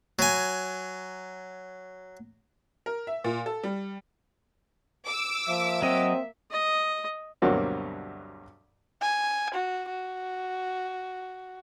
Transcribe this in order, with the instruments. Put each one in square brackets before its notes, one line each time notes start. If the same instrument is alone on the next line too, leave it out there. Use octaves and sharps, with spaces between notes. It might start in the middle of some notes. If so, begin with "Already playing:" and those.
[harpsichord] F#3 G#5
[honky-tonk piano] A#4
E5
A#2
A4
G3
[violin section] D6 E6
[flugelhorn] F3 [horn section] A#3 E5
[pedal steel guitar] F#3 D#5 [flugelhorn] C4
[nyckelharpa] D#5
[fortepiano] D2 G2 B2 F#3 A#3 C4
[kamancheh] G#5
F#4
F#4